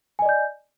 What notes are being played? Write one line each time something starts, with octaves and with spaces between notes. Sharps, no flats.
D5 D#5 G#5 G6